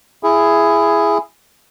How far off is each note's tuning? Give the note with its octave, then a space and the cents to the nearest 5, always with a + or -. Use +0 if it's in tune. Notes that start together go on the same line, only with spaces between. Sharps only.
E4 +15 G#4 +0